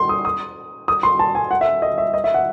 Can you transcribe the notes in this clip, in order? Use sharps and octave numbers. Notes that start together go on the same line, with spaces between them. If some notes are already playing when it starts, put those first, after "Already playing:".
Already playing: C6
D#6
D#6
D#6
C6
A5
G#5
F#5
E5
D#5
E5
D#5
E5
F#5